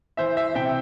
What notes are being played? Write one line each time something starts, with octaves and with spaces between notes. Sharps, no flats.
E3 C5 E5
C5 E5
C3 E5 G5